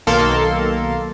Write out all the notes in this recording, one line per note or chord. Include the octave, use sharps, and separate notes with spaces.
B1 D#3 A#3 A4 A#4 C6